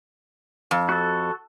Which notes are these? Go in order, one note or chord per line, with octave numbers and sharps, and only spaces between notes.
F2
F#4 A4